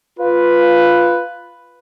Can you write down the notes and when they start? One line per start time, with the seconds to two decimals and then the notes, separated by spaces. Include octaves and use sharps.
0.19 F4 B4